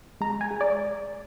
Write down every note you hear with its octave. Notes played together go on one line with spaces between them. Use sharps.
G#3 A#5
G#5
G#3
D5